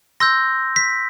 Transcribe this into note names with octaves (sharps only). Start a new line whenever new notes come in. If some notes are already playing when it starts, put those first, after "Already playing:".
C6 E6 G6 A#6
B6